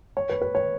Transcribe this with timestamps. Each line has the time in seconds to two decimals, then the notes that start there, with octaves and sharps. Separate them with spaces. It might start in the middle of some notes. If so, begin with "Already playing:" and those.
0.17 C#5
0.29 B4
0.42 B4
0.55 C#5